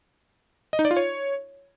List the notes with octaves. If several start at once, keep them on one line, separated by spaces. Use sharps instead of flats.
D#5
D#4
D5
F4
C#5